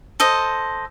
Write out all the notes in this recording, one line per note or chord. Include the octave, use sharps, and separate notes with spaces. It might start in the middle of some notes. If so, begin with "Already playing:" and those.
A4 C5 D#5